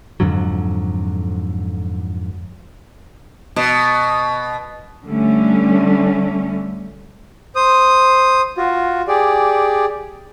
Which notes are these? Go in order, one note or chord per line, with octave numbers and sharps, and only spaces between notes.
F2 G#2 D3 F#3
B2
D3 G3 A3 C#4
C5 D#6
F4 F#4
G4 G#4 D5